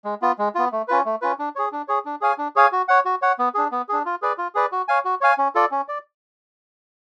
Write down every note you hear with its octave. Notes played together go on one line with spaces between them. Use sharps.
G#3
B3 F4
G#3
B3 F4
A3
C#4 F4 B4
A3
C#4 F4 B4
D4
G#4 C#5
D4
G#4 C#5
D4
G#4 C#5 F5 G#5
D4
G#4 C#5 F5 G#5
F#4
C#5 F#5
F#4
C#5 F#5
B3
D4 G#4
B3
D4 G#4
F4
G#4 B4 D5
F4
G#4 B4 D5
F#4
C#5 F5 G#5
F#4
C#5 F5 G#5
C#4
F4 A4 D5
C#4
D5